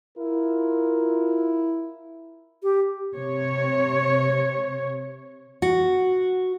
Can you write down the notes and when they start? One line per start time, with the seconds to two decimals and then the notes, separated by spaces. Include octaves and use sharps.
0.18 E4 F4 A#4
2.63 G4
3.16 C3 C#5
5.62 F#4